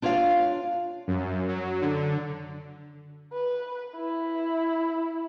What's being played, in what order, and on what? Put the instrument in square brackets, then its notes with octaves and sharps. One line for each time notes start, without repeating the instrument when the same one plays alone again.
[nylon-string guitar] D4 F4 C#5 D5 F5
[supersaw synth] F#2
F#3
D3
[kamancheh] B4
E4